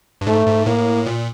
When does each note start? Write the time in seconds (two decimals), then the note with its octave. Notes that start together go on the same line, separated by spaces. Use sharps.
0.21 G2
0.27 G#2 A3
0.46 G#2
0.66 A2 A#3
1.06 A#2